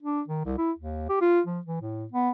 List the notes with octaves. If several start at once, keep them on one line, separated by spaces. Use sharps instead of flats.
D4
D#3
C2
E4
D#2
G4
F4
F3
E3
A2
B3